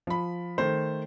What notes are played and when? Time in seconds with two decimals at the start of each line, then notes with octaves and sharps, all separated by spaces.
0.07 F3 B5
0.58 D#3 A3 C5